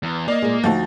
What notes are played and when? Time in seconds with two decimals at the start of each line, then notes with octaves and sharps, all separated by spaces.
0.03 E2
0.28 A#3 D5 D#5
0.42 A#2 G#3
0.64 D2 F3 D#4 F#4 A4